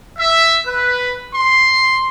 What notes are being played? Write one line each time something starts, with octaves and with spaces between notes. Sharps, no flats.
E5
B4
C6